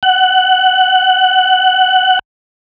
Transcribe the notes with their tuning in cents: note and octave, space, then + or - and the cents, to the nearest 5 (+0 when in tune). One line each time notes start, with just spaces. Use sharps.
F#5 +15